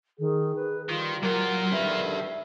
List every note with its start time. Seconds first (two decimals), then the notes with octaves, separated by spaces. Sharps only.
0.19 D#3 G#4
0.56 B4
0.89 D#3 F3 G3 F4
1.23 A#2 F#3 F4 A#4
1.72 E2 D3 D#3 G4 B4 E5